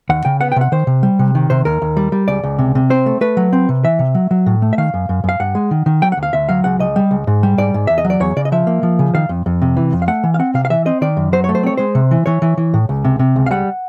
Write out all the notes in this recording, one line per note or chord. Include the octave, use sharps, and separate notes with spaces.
D#2 F#5
C#3 G5
B3 F#5
G5
C3 F#5
D#3 C5
C3
G3
C3
D#3
C3 C5
D#2 A#4
D#2
G3
G3
C#2 D5
C#2
C3
C3
C4 C5
A3
A3 B4
F#3
C4
C3
E3 E5
C3
F#3
F#3
A2
A3
E5
D#3 F5
F#2
F#2
F#2 F5
G2 F#5
G#3
D#3
D#3
F#3 G5
F#5
D2
F5
D2 E5
F#3 F5
C#2 F#5
C#2 D#5
G3
C#2
G#2
G3
G#2 D5
G#2
E2 E5
D#5
F#3
D5
E2 C#5
C#3 D5
D#5
F3 E5
A#3
F3
C#3
D#3 F5
F2
F2
C3
E3
F2
F5
A3 F#5
E3
F5
C4 F#5
C3 F5
F5
E3 E5
C4 D#5
D#3 D5
F#2
F#3 C5
A3 C#5
C5
C4 C#5
G#3 C5
C3
E3
E3 C#5
E3
E3
A2
C#2
C3
C3
C#2
F5
G3 F#5